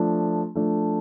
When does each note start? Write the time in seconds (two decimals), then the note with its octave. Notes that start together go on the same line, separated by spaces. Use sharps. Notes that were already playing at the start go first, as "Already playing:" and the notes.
Already playing: F3 A3 D4
0.55 F3 A3 D4